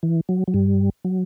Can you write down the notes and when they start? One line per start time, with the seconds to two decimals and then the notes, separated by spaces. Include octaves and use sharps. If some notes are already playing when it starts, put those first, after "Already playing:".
0.03 E3
0.29 F#3
0.48 F#3
0.54 G2 G3
1.04 F#3